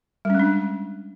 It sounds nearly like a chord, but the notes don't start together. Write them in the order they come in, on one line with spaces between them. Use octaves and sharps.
G3 C#4 G#3 D4